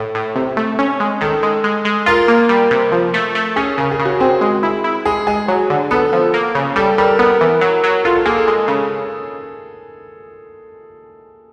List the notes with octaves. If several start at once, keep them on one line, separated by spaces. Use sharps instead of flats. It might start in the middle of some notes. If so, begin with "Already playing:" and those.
Already playing: A2 A4
A2
C3
A3
C#4
G#3
D#3 A4
G#3
G#3
G#3
F4 A#4
A#3
G3
C3
F3
A3
A3
C#4 G#4
C#3 A#4
G#4
C#3
F#4
C4 G#4
G#3
E4
E4
G#3 G#4
G#3 G#4
F#3
D3
B3 A4
F3
A#3
C#3
G3 A4
G3 A#4
B3 A#4
E3
F#3
F#3
F4 A4
A4
A#3 G#4
A4
G#3
C#3